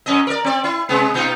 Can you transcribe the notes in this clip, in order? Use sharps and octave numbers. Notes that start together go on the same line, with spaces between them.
F#2 C#4 D#5
A#4 D5
C4 D5
E4
C3 G#3 B3
B2 D#4 F4